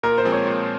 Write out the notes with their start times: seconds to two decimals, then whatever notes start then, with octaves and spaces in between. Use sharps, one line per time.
0.03 A#2 A#4
0.18 C5
0.25 F3 G#3 C4
0.32 C#5
0.47 A#2